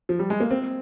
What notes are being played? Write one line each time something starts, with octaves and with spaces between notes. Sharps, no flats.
F3
G3
G#3
A#3
C4